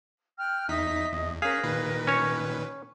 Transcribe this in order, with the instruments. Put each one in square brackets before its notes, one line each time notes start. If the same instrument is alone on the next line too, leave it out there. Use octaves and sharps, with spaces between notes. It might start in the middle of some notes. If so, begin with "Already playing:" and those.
[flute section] G5 F6 F#6
[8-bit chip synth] E2 D#4 B6 [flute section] D#5 E5
[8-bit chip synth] E2
[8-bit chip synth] C#4 B6 [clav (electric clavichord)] G#4 F5 [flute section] A#4 F#6
[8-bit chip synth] A#2 D#3 B4
[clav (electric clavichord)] C#4 C#5